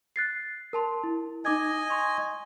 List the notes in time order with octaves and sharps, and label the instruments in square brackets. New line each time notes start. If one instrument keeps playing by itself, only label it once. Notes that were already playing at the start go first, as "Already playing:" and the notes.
[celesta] F#6 A6 C7
A#4 A5 C6
E4
[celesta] D#4 D6 G#6 [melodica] D#5 G#5
[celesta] C6 C#6